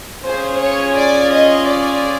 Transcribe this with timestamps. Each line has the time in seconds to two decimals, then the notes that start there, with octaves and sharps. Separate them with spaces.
0.25 C#4 F4 G#4 C5
0.61 C#5
0.97 D5
1.33 D#5
1.68 D5